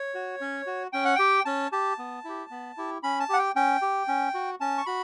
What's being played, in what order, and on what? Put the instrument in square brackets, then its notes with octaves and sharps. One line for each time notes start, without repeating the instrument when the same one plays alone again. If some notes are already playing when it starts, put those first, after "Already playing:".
Already playing: [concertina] C#5
F#4
C#4
F#4
C#4 G5
F#5
G4 G5
C#4 A5
G4 A5
B3
E4 G4
B3
E4 G4
C#4 B5
A5
G4 F#5
G5
C#4 G5
G4
C#4
F#4
C#4 A5
C#6
F#4 B5